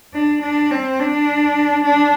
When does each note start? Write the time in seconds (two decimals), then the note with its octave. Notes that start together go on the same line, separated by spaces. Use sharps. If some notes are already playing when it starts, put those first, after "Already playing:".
0.14 D4
0.42 D4
0.71 C4
1.00 D4
1.85 D4